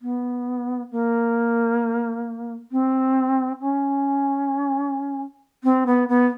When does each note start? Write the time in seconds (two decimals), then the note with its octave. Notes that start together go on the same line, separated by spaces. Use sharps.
0.02 B3
0.91 A#3
2.72 C4
3.61 C#4
5.64 C4
5.86 B3
6.08 B3